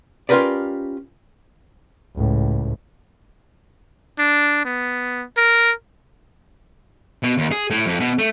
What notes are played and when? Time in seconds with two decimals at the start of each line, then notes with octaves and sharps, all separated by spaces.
0.29 C#4 F4 G4 A#4 B4 D5
2.16 C#2 A2
4.19 D4
4.65 B3
5.37 A#4
7.23 B2
7.38 D#2
7.52 G#4
7.70 A2
7.86 F2
8.00 B2
8.19 A3